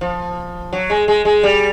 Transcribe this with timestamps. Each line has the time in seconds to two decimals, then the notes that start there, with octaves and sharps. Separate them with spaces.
0.01 F3
0.73 F#3
0.90 G#3
1.08 G#3
1.25 G#3
1.43 G3